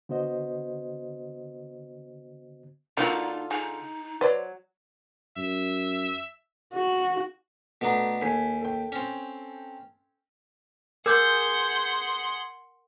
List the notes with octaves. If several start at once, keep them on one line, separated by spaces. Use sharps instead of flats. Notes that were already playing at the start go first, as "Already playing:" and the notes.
D3 B3 F#4 C5 D#5
D3 F#3 A#3 D#4 F4
D#4 G#4
F#3 B4 C5 D5
F#2 E5
F#4
B2 A3 B3 D4 A#5
D#2 A4 G#5 B6
A4 G5
C4 C#4
G#4 A#4 F#5 C6 D6 G6